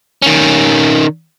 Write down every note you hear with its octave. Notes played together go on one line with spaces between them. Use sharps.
D#3 C#4